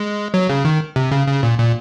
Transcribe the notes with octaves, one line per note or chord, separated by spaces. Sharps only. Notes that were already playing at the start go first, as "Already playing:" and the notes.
Already playing: G#3
F#3
C#3
D#3
C3
C#3
C#3
A#2
A#2